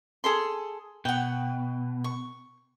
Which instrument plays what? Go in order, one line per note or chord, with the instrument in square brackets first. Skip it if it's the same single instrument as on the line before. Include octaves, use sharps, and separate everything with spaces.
[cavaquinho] G#4 A4 C6
[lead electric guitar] B2 [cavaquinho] F#5 G5
[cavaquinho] C#6